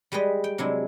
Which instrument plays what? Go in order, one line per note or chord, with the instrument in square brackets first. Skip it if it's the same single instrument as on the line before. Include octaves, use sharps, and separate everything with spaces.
[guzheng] G3 G#3 G4 B4 D#5
G5
C3 F#3 G#3 D4 E4